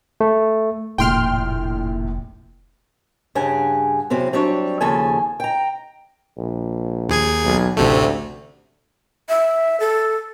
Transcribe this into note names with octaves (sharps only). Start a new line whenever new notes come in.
A3
F1 A#1 D#2 A2 G5 C6 F6
G2 C#3 G4 F#5 G#5
E2 C3 F#3 C4
F#3 G3 C4 D4 C#5
D#2 C#3 F3 A4 G#5
G5 A#5
A#1
D#2 G#4 G#6
B1
A1 D2 C3 A3
E5
A4